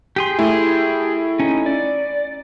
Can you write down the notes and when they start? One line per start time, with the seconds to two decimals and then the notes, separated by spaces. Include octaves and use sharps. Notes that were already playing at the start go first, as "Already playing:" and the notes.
0.16 G4 G#4 C6
0.39 A3 E4
1.40 C#4 D#4
1.66 D5